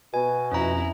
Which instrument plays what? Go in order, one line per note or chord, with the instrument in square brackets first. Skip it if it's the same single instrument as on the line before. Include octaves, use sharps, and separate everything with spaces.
[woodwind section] B2 [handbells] G#5
[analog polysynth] F2 [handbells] C#4 A#5 [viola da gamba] E4 F#4